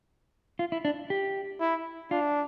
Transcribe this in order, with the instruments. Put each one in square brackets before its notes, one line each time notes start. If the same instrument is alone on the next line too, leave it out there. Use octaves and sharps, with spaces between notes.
[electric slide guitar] F4
E4
D4
G4
[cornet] E4
[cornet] D4 [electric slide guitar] F4